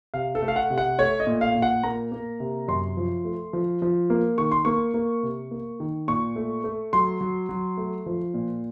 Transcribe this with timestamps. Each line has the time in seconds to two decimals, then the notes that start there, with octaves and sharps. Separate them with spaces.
0.14 C3 F5
0.35 A4
0.42 A3
0.48 F5
0.56 F#5
0.70 C3
0.78 F#5
0.98 A3 C#5
1.20 D#5
1.27 A#2
1.41 F5
1.55 A#2
1.62 F#5
1.83 A#3 A#5
2.12 A#3
2.40 C3
2.68 F#2 C6
2.97 F3
3.25 A3
3.53 F3
3.82 F3
4.10 A#3
4.38 D#3 C#6
4.52 C6
4.65 A#3 C#6
4.94 A#3
5.23 C3
5.51 A#3
5.80 D#3
6.08 A#2 C#6
6.36 A3
6.64 A3
6.93 F#3 C6
7.21 F#3
7.49 F#3
7.77 A3
8.06 F3
8.34 A#2